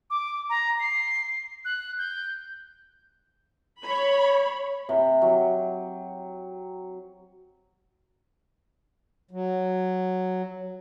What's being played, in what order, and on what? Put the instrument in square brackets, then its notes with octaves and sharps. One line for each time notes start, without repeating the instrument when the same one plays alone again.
[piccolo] D6
A#5
C7
F#6
G6
[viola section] C#5 B5
[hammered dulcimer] C3
F#3
[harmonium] F#3